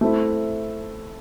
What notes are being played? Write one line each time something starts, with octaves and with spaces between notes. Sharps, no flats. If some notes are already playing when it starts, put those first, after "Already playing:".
A3 C4 E4